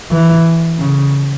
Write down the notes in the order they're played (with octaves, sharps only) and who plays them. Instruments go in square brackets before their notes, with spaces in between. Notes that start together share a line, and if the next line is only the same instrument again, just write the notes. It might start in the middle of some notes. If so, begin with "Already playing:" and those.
[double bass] E3
C#3